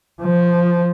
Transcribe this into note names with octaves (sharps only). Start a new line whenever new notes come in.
F3